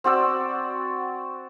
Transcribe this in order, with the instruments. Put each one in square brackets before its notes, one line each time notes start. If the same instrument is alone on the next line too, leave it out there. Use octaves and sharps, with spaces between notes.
[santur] C4 F#4 D5 E6